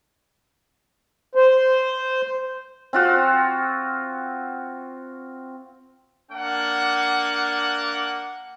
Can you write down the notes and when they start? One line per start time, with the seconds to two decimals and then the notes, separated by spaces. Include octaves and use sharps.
1.35 C5
2.93 C4 F4 F#4
6.31 A#3 D4 F#5